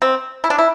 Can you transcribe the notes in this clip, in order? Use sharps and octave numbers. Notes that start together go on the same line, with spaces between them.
C4
E4
D4
E4